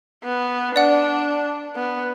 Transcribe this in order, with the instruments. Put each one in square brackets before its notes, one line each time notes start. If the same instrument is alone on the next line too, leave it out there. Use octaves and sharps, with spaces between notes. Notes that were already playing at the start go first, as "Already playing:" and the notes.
[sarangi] B3
[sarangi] D4 [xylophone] D5 F#5
[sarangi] B3